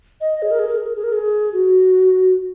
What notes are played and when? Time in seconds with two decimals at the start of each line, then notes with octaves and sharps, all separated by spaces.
0.21 D#5
0.42 G#4
0.51 A#4
0.59 G#4
0.69 A#4
0.77 G#4
0.86 A#4
0.96 G#4
1.04 A#4
1.13 G#4
1.53 F#4